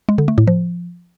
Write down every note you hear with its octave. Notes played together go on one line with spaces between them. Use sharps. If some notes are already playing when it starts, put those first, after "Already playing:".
G#3
D3
A3
A2
F3